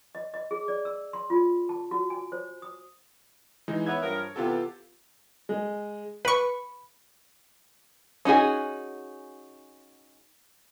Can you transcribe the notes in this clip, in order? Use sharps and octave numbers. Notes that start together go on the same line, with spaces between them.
D#5
D#5
G#4
D5
E6
C6
F4
A5
F#4
G#5
C5
D#6
E3 G#3 D#4
B3 C#5 E5 G#6
G2 F3 A#4
C3 E3 B3 F4 G4 A4
G#3
B4 B5 C#6
C#4 D#4 F#4 G#4